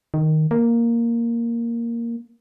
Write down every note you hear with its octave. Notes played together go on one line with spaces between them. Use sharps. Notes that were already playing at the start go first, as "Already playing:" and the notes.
D#3
A#3